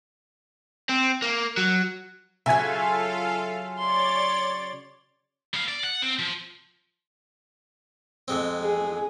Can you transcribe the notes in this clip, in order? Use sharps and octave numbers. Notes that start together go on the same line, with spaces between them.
C4
A#3
F#3
C#3 F#3 F4 A4 E5 F5 G#5 G#6
C#5 D5 C6 A6
B3 F5
D5
F#5
C4
F3
F2 G#3 C4
G#4